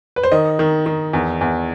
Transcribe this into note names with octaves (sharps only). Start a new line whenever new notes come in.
B4
C5
D#3 D#5
D#3
D#3
E2
E2